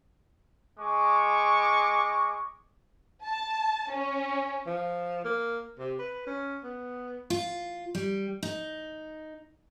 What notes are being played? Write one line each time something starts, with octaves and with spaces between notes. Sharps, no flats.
G#3 C#6 D6
A5
C#4
F3
A#3
C3
B4
C#4
B3
F4
G3
D#4